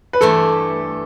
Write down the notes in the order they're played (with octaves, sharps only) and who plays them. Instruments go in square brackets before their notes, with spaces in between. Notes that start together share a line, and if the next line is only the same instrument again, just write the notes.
[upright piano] B4
[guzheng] G2 E3 A3 [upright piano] A4